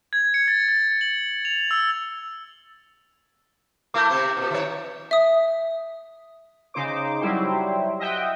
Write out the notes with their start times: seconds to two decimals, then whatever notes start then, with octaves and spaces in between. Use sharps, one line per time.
0.13 G#6
0.34 C#7
0.48 A6
0.68 A6
1.01 F#7
1.45 F7
1.71 E6
3.94 A3 E4 A#4 D6 G6
4.09 C3 C4 E4
4.37 A#2
4.51 D#3 F#3 C#5
5.11 E5 D#6
6.74 C#3 D#4 C5 D6
7.21 F#3 G3 E4 G4 C5
8.00 D#5 E5 F#5 G5